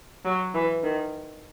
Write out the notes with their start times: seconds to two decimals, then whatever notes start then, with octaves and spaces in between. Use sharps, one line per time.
0.25 F#3
0.54 E3
0.83 D#3